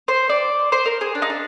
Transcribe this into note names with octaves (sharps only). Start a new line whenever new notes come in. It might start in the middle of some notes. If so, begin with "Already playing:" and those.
C5
D5
C5
A#4
G#4
D4
D#4
D4